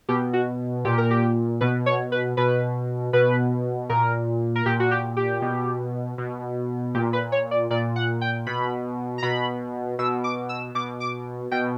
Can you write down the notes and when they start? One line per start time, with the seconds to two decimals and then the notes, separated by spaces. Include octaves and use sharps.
0.08 B2 G4
0.33 F#4
0.85 A#2 G4
0.98 A#4
1.11 G4
1.61 B2 B4
1.86 C#5
2.12 B4
2.37 B2 B4
3.13 B2 B4
3.89 A#2 A#4
4.56 A#4
4.66 A#2 G4
4.80 F#4
4.91 G4
5.17 G4
5.42 B2
6.18 B2
6.94 A#2 G4
7.13 B4
7.32 C#5
7.51 D5
7.70 A#2 D5
7.96 F#5
8.21 G5
8.47 B2 B5
9.18 A#5
9.23 B2 B5
9.99 B2 E6
10.24 D6
10.49 E6
10.75 B2 D6
11.00 D6
11.51 B2 G5